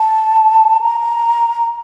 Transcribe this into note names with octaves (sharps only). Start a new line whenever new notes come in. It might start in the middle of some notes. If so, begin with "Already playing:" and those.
Already playing: A5
A#5